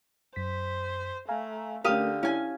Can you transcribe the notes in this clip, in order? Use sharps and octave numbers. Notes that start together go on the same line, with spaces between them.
F#2 C5 B6
A3 F5 G#5 A#5
D3 A3 C#4 G4 A#4 F5 D#6
C#4 E4 G#5